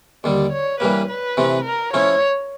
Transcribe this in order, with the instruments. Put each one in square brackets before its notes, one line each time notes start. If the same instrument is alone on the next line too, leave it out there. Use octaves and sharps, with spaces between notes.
[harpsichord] D#2 D3 G3 [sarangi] D5
[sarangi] C#5
[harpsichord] G2 E3 G3 A#3 [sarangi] B4
[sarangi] B4
[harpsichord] C3 E3 A3 C4
[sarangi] A#4
[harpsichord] F3 A3 C#4 E4 [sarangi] C#5